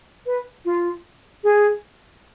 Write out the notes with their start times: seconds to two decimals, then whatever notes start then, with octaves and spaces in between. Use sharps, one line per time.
0.26 B4
0.65 F4
1.44 G#4